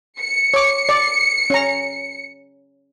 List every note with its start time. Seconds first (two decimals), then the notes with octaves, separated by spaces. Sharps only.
0.20 C#7
0.54 C#5 D6
0.89 D5
1.50 C#4 A#5